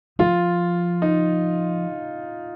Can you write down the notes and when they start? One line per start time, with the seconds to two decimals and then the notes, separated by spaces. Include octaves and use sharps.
0.19 F3 F4
1.02 D#4